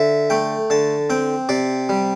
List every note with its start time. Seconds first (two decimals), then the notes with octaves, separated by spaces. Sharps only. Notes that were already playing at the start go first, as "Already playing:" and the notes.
Already playing: D3 E5
0.30 A3 G5
0.70 D3 A5
1.10 C4 G5
1.49 C3 D5
1.89 G3